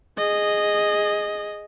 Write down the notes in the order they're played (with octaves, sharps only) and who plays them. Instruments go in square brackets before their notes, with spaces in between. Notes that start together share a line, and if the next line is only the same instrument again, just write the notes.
[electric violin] G#4 D#5